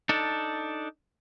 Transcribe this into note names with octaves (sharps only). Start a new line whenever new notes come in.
D4 D#4 A4